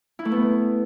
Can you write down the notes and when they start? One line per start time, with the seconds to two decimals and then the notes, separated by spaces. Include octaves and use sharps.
0.19 E4
0.25 A3
0.32 B3